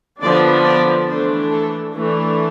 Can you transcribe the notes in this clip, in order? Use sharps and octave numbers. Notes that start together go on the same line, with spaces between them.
D3 F3 B3 D4 D5
D5
E3 A3 D4 C5
A4
E3 A3 D4